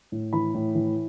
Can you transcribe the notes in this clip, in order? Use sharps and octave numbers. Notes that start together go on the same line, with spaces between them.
A2
E3 B5
A2
E3